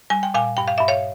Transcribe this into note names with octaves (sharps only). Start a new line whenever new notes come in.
G3 G#5
G5
A#2 F5 G#5
G2 G5
F5
G2 E5
C#5 F5